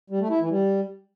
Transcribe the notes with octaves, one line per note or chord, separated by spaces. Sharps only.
G3
A3
E4
E3
G3